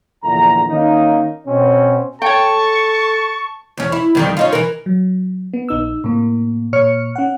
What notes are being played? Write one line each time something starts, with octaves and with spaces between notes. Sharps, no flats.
A#1 E2 D3 A#5
D#3 A#3 C#4 D#4
B2 C4 C#4
A4 C#5 G5 A5 C#6
E2 C#4
E4
F2 D#3 G3
C#4 D#4 F4
E3 A#4
F#3
B3
A#1 D#4 E6
A2 C3 A#3
A#2 C#5 F6 C#7
C#4 F#5